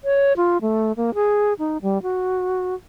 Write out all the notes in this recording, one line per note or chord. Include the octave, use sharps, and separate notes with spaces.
C#5
F4
A3
A#3
G#4
D#4
G3
F#4